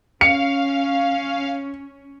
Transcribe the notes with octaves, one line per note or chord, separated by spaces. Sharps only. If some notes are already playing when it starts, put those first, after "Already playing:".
C#4 F5 C#7